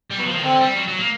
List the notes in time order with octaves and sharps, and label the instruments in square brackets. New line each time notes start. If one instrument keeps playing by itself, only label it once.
[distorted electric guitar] G3
[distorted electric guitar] F#3 [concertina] B3
[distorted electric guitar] F3
D#3
[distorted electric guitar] D3 [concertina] C4
[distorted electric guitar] G3
F#3
F#3
A#3